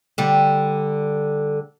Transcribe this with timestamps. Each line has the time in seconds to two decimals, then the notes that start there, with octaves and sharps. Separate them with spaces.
0.18 D3 G3